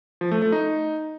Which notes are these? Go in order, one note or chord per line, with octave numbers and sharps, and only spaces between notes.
F3
A3
A3
D#4